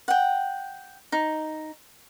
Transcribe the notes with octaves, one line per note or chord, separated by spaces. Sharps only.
F#5 G5
D#4